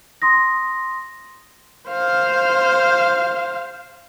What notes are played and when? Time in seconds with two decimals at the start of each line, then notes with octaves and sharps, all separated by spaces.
0.22 C6 D#6 A#6
1.89 C5 F5